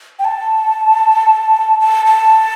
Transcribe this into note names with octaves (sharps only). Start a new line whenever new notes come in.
G5
A5
A5
A5